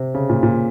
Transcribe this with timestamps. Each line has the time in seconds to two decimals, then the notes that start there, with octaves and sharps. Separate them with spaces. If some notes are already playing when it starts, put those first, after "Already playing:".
Already playing: C3
0.14 C#3
0.30 A#2
0.43 A#2